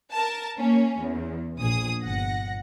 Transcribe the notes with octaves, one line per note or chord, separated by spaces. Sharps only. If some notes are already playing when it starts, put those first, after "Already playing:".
A#4 A5
A#3 C#4
E2
A#1 G#4 D#6
G1 F#5 A#6